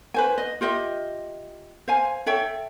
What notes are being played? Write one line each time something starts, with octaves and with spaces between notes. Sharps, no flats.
B4 C5 G#5
D#5
F4 G4 D#5 E5
C5 F5 G#5
A4 C#5 E5 G5